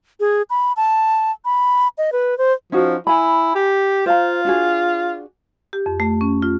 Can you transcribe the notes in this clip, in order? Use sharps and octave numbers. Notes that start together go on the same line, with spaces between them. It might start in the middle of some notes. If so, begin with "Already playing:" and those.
G#4
B5
A5
B5
D#5
B4
C5
F3 C#4 D#4 F#4
E4 G#5 B5
G4
F4 C5 F5 A#5
D4 F#4 G#4
G4
F2
A3
C#4
F4